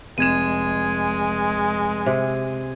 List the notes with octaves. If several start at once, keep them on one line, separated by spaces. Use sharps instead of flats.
F1 G#3 G#6 D#7 E7
C3